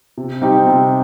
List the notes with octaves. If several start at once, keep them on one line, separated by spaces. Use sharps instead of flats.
C3
G3 C4 D#4 G4
C3